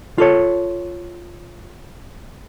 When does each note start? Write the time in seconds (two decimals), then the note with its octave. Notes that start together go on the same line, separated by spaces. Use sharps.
0.18 F4 A4 C#5